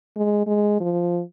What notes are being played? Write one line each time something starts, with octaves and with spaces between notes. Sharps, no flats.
G#3
G#3
F3